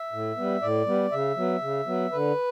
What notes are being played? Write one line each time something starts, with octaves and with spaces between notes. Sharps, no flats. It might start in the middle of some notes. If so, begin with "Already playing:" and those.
Already playing: E5
A2
G3 B3
A2 D5
G3 B3
C#3 E5
F#3 B3
C#3
F#3 B3
D3 B4